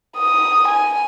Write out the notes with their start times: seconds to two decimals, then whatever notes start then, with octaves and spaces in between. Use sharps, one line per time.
0.18 D#6
0.68 G#5